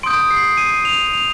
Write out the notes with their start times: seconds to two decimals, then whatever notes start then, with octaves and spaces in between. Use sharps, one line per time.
0.03 C6 D#6 G6 D7
0.31 C7
0.57 D#7
0.85 F7
1.13 F7